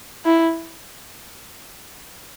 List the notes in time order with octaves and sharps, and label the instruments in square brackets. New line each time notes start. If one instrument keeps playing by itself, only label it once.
[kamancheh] E4